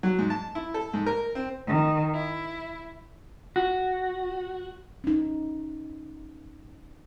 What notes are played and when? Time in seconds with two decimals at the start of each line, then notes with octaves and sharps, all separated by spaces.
0.03 F#3
0.19 G#2
0.30 A5
0.55 E4
0.74 A4
0.94 G#2
1.06 A#4
1.35 C4
1.68 D#3
2.14 E4
3.56 F#4
5.04 C#4 D#4